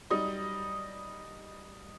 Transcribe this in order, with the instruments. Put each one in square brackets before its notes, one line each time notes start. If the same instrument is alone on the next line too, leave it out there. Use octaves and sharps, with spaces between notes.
[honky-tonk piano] F#3 G3 D#4 [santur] D#5